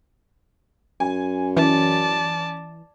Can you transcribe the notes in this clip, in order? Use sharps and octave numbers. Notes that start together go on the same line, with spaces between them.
F#2 G#5
E3 C#4 D5 A5